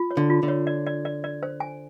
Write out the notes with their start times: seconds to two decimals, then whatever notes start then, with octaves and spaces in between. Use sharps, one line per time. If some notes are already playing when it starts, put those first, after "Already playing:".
Already playing: F4
0.11 C#5
0.17 D3
0.30 F4
0.43 D3
0.48 C#5
0.67 D5
0.86 D5
1.05 D5
1.24 D5
1.43 C5
1.60 G#5